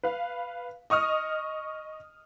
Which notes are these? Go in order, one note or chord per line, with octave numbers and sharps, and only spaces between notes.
B4 F5
D#5 C#6 D#6 F6